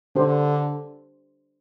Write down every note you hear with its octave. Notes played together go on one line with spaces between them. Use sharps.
D3 D4 G4 C5